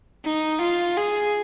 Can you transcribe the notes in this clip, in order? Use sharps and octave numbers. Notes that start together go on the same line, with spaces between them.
D#4
F4
G#4